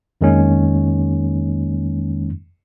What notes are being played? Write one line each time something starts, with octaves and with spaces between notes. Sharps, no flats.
F2 D#3 G#3 A#3 C#4 D#4